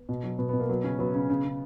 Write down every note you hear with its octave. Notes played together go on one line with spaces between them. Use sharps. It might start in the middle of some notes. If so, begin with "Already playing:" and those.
Already playing: B3
B2
F#3
B2 B3
B2 B3
A#3
F#3 B3
C#3 C#4
F#3 B3
C#3
C#3
C#3